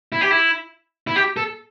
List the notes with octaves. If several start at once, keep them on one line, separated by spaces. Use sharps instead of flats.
E4
G4
E4
E4
G4
A4